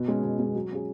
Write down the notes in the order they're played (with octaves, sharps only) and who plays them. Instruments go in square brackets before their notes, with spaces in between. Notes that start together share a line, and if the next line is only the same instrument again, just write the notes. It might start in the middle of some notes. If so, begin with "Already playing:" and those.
Already playing: [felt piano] B2
G#3 C#4
B2
G#3 C#4
F#3
C#4 G#4